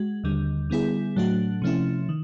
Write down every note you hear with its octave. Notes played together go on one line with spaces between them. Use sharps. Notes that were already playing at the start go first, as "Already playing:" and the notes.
Already playing: G#3 F#4
D#2 D3 G3
D3 G3 B3 E4 G#4
A2 F#3 A3 D4 F#4
C3 F3 A3 C#4 E4
D#3